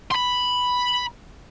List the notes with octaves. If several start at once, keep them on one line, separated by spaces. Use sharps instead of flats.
B5 C6